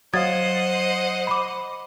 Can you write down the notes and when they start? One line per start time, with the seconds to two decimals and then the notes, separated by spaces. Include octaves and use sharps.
0.14 F#3 C5 D#5 F5 F#5 D#6 G#6 A6
1.27 B5 D6